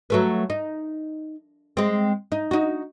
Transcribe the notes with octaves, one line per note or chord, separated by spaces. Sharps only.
F#3 A3 B4
D#4
G#3 C4
D#4
D#4 F#4